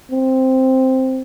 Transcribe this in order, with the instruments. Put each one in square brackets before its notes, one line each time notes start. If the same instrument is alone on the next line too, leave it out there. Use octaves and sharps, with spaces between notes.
[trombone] C4